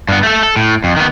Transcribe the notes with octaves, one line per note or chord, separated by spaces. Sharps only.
G2 B3
A3 A4
A4
A2
F2
D#3 B3